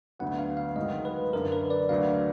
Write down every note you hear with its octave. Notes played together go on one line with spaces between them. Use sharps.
D2 D3 F#3 B3 F#5
F5
F5
G#2 D#3 F#3 D#5
B4
F#1 F#2 D3 A#4
B4
D5
D2 D3 F#3 F5